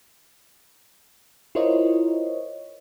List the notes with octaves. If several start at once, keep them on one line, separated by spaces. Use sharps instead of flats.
E4 F4 A#4 C5 C#5 D#5